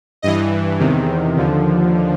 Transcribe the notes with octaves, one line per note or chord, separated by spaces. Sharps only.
G2 E3 D#5
E2 C3 D#3
D#2 D3 F3